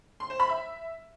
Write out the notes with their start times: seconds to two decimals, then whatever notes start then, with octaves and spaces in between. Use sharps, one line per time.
0.20 C6
0.30 C5
0.40 B5
0.49 E5